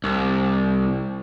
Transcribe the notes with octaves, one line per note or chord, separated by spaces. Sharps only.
C2